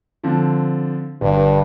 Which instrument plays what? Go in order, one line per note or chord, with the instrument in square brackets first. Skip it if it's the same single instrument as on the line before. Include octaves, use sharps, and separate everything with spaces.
[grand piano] D3 F3 C4
[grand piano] G1 [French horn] G2